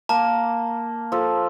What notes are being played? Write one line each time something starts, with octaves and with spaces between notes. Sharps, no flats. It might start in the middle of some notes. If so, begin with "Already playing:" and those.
A#3 A5
F3 A4